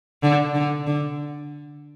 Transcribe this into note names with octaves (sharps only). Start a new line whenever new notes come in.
D3
D3
D3